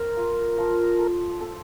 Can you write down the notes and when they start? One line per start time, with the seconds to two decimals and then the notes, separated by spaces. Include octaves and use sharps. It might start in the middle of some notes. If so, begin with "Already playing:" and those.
Already playing: C4 A#4
0.17 F4
0.58 F3
0.99 A4
1.40 A4